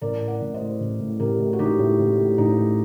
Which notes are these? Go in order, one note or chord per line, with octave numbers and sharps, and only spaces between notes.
A1 A#4 D5
A2
D5 F#5
A1
C5 D#5
A2
A1
A2
A1 G4 A#4
A2
F#4
A1 D#4 G4
A2
A1
A2
A1 D#4
A2